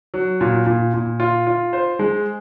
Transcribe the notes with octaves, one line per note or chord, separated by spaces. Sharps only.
F#3
A#2
A#2
A#2
F4
F4
C5
G#3